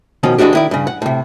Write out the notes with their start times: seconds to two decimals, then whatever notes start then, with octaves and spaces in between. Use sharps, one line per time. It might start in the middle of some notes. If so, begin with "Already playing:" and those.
0.23 B2 D#3 F3 C#4
0.38 E3 G#3 D4 F#4 G4
0.53 D#3 E4 D5
0.71 G2 C#3
0.87 F#5
1.02 A2 C3